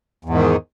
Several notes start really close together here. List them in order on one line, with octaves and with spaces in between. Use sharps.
E2 G#2 D#3